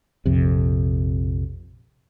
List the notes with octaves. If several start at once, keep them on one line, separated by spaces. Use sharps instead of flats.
A#1 F2 C3